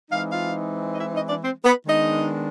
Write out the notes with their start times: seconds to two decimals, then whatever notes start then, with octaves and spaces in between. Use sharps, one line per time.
0.11 E3 G#3 C4 D#4 F5
0.30 F4 F5
0.93 D#5
0.99 E4 E5
1.13 D#4 D#5
1.28 D4 D5
1.42 C4 C5
1.65 B3 B4
1.87 D#3 G#3 B3 D4 D#4 D#5